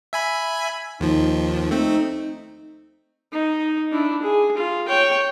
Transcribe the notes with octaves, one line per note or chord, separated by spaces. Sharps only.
E5 G#5 B5
D#2 F3 D#4
A3 C4 D#4
D#4
D4 E4
G#4
F4
C#5 G5